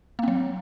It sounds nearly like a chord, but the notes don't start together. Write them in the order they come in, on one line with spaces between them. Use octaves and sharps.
A#3 C4 F#3